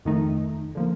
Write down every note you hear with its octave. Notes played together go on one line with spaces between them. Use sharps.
F2 D#3 A3 D#4
D3 F3 A#3